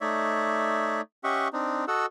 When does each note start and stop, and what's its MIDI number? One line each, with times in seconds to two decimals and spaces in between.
0.01 1.01 57
0.01 1.01 63
0.01 1.01 73
0.01 1.01 74
0.01 1.01 76
1.24 1.48 61
1.24 1.48 67
1.24 1.48 75
1.24 1.48 76
1.24 1.48 78
1.24 1.48 85
1.53 1.85 60
1.53 1.85 62
1.53 1.85 63
1.88 2.06 66
1.88 2.06 69
1.88 2.06 75
1.88 2.06 78
1.88 2.06 88